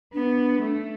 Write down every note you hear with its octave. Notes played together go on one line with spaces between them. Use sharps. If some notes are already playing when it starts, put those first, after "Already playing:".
B3 D4
A3